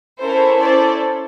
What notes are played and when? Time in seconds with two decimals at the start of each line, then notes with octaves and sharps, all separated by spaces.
0.22 C#4 E4 A4 A#4 C5
0.60 C5 D5